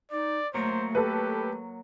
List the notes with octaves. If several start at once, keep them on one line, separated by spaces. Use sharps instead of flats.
D#4 D5
F#3 A3 A#3 C5 C#5
G4 A4 B4